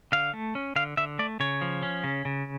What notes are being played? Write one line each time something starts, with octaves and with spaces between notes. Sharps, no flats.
D3 F5
A3
C#4
D3 F5
D3 E5
A3 D5
C#3 C#5
F3
C#4
C#3
C#3